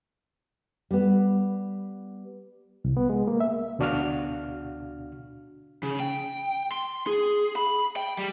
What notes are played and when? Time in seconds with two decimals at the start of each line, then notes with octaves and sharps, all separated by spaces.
0.91 G3 B3
2.85 C2
2.97 B3
3.10 G#3
3.28 A#3
3.40 E5
3.79 D2 B2 D4 F#4 F5 F6
5.83 C#3
6.00 G5
6.72 C6
7.07 G#4
7.56 B5
7.96 G5
8.18 G3